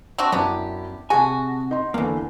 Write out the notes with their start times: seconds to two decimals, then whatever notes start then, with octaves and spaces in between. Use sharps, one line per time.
0.18 C4 D4 F#4
0.32 F#2 B3 D4 E4 G4
1.10 C3 F#4 G#4 G#5 A5
1.71 D#4 C6
1.94 E2 D3 E3 A#3